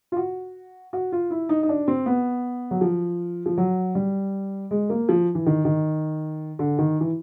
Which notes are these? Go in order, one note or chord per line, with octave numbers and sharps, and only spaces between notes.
F4
F#4
F#4
F4
E4
D#4
D#4
D4
C4
B3
F#3
F3
F3
F#3
G3
G#3
A#3
F3
E3
D#3
D#3
D3
D#3
E3